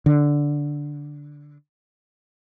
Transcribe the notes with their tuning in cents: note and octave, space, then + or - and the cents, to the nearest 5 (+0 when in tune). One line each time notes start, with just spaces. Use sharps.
D3 -5